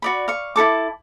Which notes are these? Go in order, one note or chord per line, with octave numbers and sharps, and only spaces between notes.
F#4 D5 B5
F5 C#6
E4 F#4 A4 D6